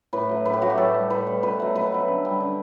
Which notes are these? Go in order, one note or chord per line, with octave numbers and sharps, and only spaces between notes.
A2 B4
F#3 A3
A2 B4
G4
F#3 A3 F#4
G4
A2 A4
G3
A2 B4
G3
B2 B4
F#3 A3
B2 B4
F#3 A3
D3
G3
D3